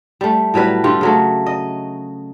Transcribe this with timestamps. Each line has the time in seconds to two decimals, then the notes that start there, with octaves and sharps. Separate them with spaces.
0.21 G3 A3
0.54 A2 F#3 G3 B4
0.84 D3 G3 F4
1.01 C#3 F#3 A3
1.46 D#5